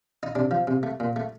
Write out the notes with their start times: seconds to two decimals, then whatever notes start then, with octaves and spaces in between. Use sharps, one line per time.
0.23 D#4
0.35 C3 D4
0.51 F3
0.67 C3
0.83 A3
1.00 A#2
1.16 A3